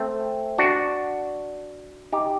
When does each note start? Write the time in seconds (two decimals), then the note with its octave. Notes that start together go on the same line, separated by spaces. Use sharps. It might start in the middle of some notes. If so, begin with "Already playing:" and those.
Already playing: A3 C4
0.58 D4 F#4
2.12 D#4 G4